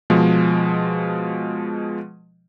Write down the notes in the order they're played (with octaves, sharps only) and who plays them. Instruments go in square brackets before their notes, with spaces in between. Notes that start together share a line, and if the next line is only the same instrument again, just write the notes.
[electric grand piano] B2 F3 G#3